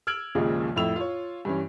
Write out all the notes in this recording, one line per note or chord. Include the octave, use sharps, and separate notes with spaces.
E6 F6 G#6 D7 F#7
A#1 D#2 A#2 C#3 F3 G#3
F2 A2 E4 E6 F7
F4 C#5
G2 E3 C#4